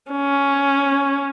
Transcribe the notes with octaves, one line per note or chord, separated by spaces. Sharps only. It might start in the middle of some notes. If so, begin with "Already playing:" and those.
C#4